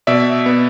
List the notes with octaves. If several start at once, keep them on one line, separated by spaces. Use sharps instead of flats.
B2 D5 E5
B3